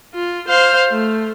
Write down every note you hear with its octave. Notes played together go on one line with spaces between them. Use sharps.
F4
C5 F5
A3